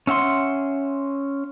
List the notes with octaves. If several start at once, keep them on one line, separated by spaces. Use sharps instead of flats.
C#4 E5 F#5 C6